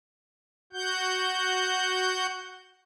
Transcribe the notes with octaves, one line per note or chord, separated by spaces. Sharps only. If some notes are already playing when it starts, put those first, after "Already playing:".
F#4 F#5 G6